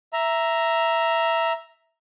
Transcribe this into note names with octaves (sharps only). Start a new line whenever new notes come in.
E5 A#5